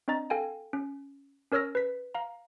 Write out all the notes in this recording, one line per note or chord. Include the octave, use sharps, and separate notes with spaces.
C4 D4 D#5 A#5 A6
A4 F5 G5 G#5
C#4
C#4 A#4 C#5 E6 F6 A#6
B4 B6
F5 A#5